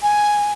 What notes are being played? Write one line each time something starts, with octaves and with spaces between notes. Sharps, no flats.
G#5